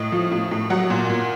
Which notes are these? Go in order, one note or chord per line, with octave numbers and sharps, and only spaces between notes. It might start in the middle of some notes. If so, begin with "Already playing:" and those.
Already playing: A2 D#5
F3
A2
A2
F#3 F#5
A#2
A#2